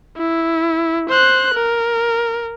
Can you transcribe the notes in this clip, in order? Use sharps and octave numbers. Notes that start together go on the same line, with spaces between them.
E4
C5 F#6
A#4